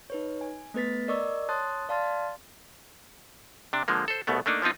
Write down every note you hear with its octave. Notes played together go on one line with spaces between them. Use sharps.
D#4 B4 C#5
G#5
A3 B3 B4 A6 B6
A#4 D5 D#5 C#6 D6 E6
C#5 A5 C6 D#6 F#6 A6
D5 F5 A5 C6 F6 A6
C3 D4
D3 F3 G#3 A#3
A4 C5
C2 B2 A3 B3
A3 A#3 D4 D#4
F3 B3 C4 D#4 F4